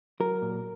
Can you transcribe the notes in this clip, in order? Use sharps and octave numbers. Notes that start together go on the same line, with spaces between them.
F#3 A#4
A#2